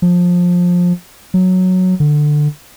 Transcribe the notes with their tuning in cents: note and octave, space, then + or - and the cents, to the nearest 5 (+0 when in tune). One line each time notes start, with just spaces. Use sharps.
F3 +20
F#3 -5
D3 +15